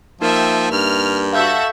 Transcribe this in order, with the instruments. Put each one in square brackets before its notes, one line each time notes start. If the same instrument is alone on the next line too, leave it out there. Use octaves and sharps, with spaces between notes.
[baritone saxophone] F3 [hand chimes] A#3 D#4 A#4 [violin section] E5 G5
[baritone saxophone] G2 [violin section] F6
[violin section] F#4 A4 E5 [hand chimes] F5 G6